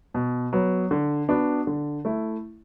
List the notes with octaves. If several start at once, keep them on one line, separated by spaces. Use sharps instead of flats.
B2
F#3 B3
D3
B3 D4 F#4
D3
A3 E4